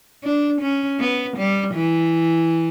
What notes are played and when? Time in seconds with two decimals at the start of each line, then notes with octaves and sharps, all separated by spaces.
0.24 D4
0.61 C#4
1.00 B3
1.37 G3
1.74 E3